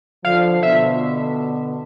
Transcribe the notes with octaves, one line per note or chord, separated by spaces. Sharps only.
D3 F3 F5
B2 D3 E5